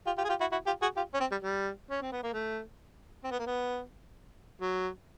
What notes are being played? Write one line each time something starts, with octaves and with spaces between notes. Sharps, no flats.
F4 G4
F4 G4
G#4
F4 G4
E4 F#4
E4 F#4
F4 G4
F#4 G#4
F4 G4
C#4
C4
G3
G3
C#4
C4
B3
A#3
A3
C4
B3
A#3
B3
F#3